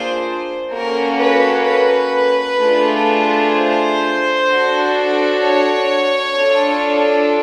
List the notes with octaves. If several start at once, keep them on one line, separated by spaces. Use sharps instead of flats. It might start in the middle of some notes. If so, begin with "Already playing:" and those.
Already playing: A#3 D4 F4 G#4 C5
A#3 C#4 F#4 A4 A#4
B4
B4
A3 D4 F4 G#4
C5
D4 F#4 A4
C#5
D4 F4 A4